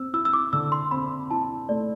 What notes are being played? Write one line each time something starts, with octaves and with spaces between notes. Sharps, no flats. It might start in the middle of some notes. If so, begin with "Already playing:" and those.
Already playing: C4 E6
E4 E6
E6
D6
D3 E6
C6
C4 B5
E4 A5
A3 D5